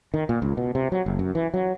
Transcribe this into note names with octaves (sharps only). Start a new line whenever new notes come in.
D#3
A#2
C#2
B2
C3
F#3
F#1
F#2
E3
F#3